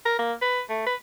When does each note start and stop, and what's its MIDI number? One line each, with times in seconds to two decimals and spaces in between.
0.05 0.15 70
0.18 0.32 58
0.42 0.61 71
0.69 0.85 57
0.86 0.95 71